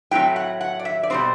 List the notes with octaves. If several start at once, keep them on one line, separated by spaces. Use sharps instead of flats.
A2 F#3 A3 C4 G5
F#5
F#5
D5
E5
D5
B2 G3 C4 C5